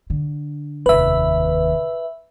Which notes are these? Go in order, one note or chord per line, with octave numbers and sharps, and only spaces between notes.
D3
F1 D#2 B4 E5